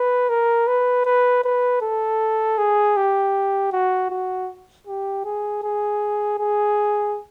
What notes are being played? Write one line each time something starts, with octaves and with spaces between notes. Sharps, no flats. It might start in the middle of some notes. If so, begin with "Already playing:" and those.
Already playing: B4
A#4
B4
B4
B4
A4
G#4
G4
F#4
F#4
G4
G#4
G#4
G#4